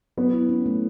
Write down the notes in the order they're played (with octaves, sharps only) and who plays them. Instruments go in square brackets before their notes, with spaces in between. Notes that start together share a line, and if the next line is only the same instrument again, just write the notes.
[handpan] F#3 [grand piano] B3
[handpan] E4
C#4
A3